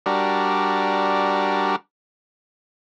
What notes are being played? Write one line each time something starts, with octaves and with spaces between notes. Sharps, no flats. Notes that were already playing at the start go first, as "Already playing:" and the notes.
G3 D4 F#4 A#4